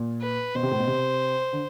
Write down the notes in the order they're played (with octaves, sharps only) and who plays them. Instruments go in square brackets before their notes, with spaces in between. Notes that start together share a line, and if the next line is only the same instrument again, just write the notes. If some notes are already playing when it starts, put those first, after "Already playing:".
Already playing: [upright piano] A#2
[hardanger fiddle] B4
[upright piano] B2 [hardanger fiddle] C5
[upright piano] C3
A2
B2
C3
D3